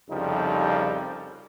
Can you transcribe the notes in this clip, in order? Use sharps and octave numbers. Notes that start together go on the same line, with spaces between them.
C2 F2 C#3 F3 G3 D#4